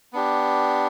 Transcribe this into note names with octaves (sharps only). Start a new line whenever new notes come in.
B3 D4 G4